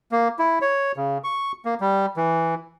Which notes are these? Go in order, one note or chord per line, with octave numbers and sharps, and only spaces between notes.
A#3
E4
C#5
C#3
C#6
A#3
G3
E3